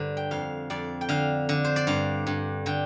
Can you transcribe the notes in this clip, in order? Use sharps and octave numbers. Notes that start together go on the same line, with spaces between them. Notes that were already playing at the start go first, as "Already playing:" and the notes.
Already playing: G2 D3 A#4 C5
G5
F2 F5
F2 D5
G5
D3 F5
D3
C5
D5
G2 F5
G2
D3 G5